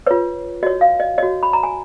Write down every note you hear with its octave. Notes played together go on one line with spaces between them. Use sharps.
F4 B4 C#5
F#4 C#5 D#5
F5
D#5
F#4 C#5 D#5
B5
A#5
G#5